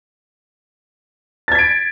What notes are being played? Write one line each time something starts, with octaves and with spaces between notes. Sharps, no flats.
G#6 A6 B6 D7